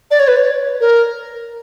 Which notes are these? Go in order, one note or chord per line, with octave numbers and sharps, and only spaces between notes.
D5
C#5
B4
C#5
A#4